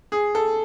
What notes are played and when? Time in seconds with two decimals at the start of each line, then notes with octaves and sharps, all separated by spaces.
0.12 G#4
0.35 A4